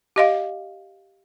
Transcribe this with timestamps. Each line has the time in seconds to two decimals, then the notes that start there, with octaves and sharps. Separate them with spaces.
0.16 G4 D#5 F5